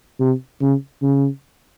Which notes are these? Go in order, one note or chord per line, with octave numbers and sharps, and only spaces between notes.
C3
C#3
C#3